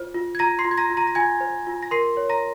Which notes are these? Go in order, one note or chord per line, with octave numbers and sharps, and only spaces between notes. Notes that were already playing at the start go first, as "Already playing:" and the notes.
Already playing: F4 C5
F4
G#6
F4 A#5 A#6
C6 C7
F4
G#6
A#5 A#6
F4
A#5 A#6
A#6
F4 G#5 G#6
C5
F4
A#6
A#4 C6 C7
C#5
A#5 A#6